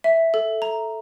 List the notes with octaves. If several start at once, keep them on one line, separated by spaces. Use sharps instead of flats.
E5
A4
A#5